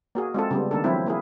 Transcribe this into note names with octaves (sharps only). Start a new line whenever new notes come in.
A#3 F#4 G#4
G#3 C4 F4 A4
C#3 G3 B3
D#3 A#3 D4 A4
F3 F#3 C4 E4
A#3 E4 G#4